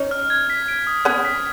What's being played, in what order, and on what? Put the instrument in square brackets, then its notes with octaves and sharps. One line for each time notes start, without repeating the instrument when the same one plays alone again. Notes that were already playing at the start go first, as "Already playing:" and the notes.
Already playing: [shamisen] C#4 D#4
[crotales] F6
G#6
B6
D7
D#6
[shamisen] B3 C#4 [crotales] G#6
[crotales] B6